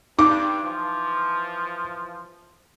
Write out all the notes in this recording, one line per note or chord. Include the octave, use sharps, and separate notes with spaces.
G2 D#4 D6
E3 F3